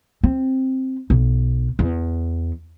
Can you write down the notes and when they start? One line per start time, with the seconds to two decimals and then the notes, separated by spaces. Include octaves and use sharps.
0.23 C4
1.10 B1
1.79 E2